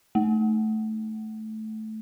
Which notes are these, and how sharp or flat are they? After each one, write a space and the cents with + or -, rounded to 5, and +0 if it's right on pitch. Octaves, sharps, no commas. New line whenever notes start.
A3 -10